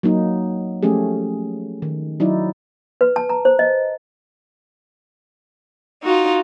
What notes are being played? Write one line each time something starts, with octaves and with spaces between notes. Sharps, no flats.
F#3 A#3 D#4
F3 A3 C#4 G4 G#4
D#3
F#3 D#4 E4 D5
B4
A5
A#5
C5
D#5
D#4 F4 F#4